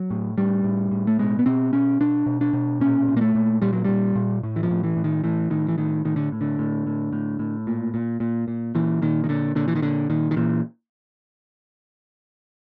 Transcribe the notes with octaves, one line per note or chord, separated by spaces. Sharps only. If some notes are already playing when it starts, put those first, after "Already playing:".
Already playing: F#3
A2
A2 G3
A2
A2
A3
B2 G#3
B3
B2 C4
B2 C#4
B2 D4
B2
D4
B2
A#2 C#4
A#2
A#3
A3
A#2
A#2 G3
F#3
A#2 G3
A#2
A2
E3
F3
A2
E3
A2
D#3
A2 E3
A2 D#3
E3
A2 D#3
A2 D#3
D3
A2
D3
A2
A2
A2
A2
A#2
A#2
A#2
A#2
A#2 E3
A#2 D#3
D#3
A#2 D3
A#2 D3
E3
D#3
A#2 D3
A#2 D#3
D#3
A#2 E3